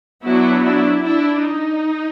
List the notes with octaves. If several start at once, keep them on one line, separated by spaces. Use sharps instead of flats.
F#3 B3 D4 E4 F#4
D4 E4
D4 E4
D#4